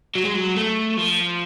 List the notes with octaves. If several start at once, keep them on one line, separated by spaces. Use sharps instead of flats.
F#3
G#3
F#3
A3
F3